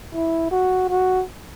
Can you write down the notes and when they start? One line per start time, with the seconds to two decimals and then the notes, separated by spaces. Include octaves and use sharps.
0.14 E4
0.51 F#4
0.89 F#4